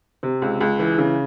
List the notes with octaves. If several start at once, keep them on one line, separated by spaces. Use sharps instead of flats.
C3
C#2
C#2
E3
C#3